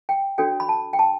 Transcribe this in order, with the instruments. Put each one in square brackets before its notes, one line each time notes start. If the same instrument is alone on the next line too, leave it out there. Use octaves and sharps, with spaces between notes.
[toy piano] G5
D4 F#4 A4 C#5 G5
B5
A5
G5
A5